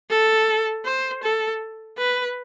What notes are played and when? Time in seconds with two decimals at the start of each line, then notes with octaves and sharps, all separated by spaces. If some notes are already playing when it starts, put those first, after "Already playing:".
0.10 A4
0.85 C5
1.23 A4
1.98 B4